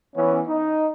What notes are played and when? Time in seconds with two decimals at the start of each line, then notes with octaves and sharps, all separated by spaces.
0.15 E3 B3 C#4
0.47 D#4